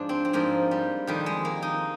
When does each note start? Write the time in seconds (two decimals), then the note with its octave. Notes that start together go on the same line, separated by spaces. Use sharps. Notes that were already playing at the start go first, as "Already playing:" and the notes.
Already playing: G#2 F3 D4
0.09 C4
0.25 C4
0.33 G#2 F3 A#3
0.71 G3
1.07 F2 D#3 G3
1.26 G#3
1.45 A#3
1.62 D#4